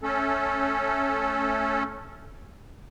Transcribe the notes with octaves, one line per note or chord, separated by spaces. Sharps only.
A3 C#4 A4